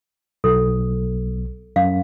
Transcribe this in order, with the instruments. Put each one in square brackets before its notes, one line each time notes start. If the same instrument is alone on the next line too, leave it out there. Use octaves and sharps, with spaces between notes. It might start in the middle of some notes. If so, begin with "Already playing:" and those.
[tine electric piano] B1 [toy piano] A4
[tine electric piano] F#2 [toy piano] F5